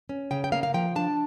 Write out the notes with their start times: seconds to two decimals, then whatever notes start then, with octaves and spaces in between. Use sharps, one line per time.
0.09 C#4
0.31 C#3 G5
0.44 G5
0.52 A#3 F5
0.63 F5
0.74 F3 G5
0.96 D4 A5